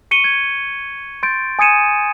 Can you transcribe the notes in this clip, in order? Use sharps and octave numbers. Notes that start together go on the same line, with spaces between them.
C#6 C#7 D#7 G7
G#6
C6 G6 A6 D7
G#5 D#6 G#6 C#7 D#7 E7